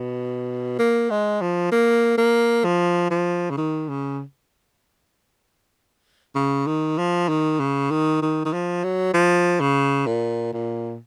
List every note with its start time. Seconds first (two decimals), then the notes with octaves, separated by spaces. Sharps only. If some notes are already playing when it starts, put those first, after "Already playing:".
Already playing: B2
0.79 A#3
1.10 G#3
1.41 F3
1.72 A#3
2.18 A#3
2.64 F3
3.11 F3
3.50 C#3
3.57 D#3
3.89 C#3
6.35 C#3
6.67 D#3
6.98 F3
7.28 D#3
7.60 C#3
7.91 D#3
8.22 D#3
8.45 D#3
8.53 F3
8.84 F#3
9.14 F3
9.61 C#3
10.06 A#2
10.53 A#2